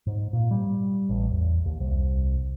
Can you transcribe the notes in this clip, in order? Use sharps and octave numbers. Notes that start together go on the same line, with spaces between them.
G#2
A#2
G3
A1
E2
D#2
C2